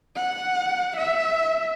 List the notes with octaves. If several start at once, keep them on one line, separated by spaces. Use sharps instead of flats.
F#5
E5